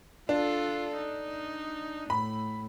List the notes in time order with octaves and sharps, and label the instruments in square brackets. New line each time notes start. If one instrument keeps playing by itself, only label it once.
[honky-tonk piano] D4 [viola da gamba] F4 A4
[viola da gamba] D#4
[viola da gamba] A2 [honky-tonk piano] B5